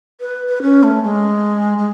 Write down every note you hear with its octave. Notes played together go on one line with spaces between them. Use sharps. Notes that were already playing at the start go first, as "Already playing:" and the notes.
B4
B4
C#4
A3
G#3
G#3